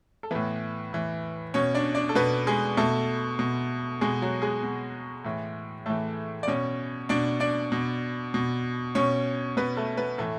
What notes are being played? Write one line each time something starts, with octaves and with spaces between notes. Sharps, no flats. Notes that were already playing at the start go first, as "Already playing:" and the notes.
A4
A2 E3 B3 B4
A2 E3
B2 C#4 C#5
D4 D5
D4 D5
A4
B2 B3 B4
G#3 G#4
B2 A3 A4
B2
B2 G#3 G#4
F#3 F#4
G#3 G#4
B2
A2 E3
A2 E3 A3 A4
D5
B2 C#4 C#5
B2 D4 D5
D4 D5
B2
B2
B2 C#4 C#5
B2 B3 B4
A3 A4
B3 B4
A2 E3 A3 A4